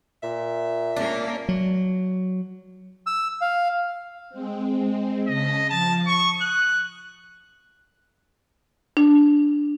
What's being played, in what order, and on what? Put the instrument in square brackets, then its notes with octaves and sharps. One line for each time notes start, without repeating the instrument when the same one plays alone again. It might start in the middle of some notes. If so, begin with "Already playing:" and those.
[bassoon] A#2 [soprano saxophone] E5
[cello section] A#3 C#4 [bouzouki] D4
[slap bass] F#3
[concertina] E6
F5
[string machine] G#3 C4
[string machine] C#3 A5 B6 [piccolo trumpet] D#5
[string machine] F3 [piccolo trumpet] A5
[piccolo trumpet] C#6 [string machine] D#6
[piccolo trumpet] F#6
[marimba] D4